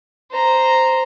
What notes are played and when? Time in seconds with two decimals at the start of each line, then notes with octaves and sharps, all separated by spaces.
0.31 C5 A#5